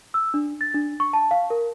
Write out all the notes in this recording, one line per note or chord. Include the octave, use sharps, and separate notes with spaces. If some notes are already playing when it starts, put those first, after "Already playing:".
E6
D4
A6
D4
C#6
A5
F5
A#4